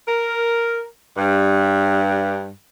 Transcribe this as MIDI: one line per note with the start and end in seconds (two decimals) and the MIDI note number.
0.08 0.85 70
1.18 2.51 43